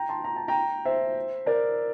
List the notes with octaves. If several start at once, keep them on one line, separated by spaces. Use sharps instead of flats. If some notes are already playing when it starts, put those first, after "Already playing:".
Already playing: G5 A#5
A5 C6
A#5
A5
G5 A#5
C5 E5
A#4 D5